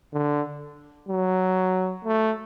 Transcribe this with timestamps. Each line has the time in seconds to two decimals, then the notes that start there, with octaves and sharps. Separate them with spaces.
0.13 D3
1.08 F#3
2.05 A3